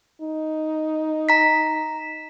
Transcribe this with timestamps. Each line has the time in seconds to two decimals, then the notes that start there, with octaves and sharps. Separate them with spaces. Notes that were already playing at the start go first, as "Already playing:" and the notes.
0.22 D#4
1.29 A#5 B6